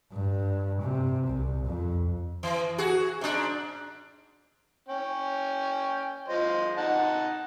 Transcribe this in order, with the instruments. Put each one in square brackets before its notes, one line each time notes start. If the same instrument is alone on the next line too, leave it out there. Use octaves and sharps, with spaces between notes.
[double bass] G2
C3
C2
F2
[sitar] E3
F#4 G#4
G#2 D4
[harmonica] C#4 G5
F3 C5 D#5
D#4 F#5 A5